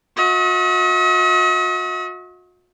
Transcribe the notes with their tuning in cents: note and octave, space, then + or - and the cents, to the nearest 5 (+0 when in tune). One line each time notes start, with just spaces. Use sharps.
F#4 -40 D#5 +45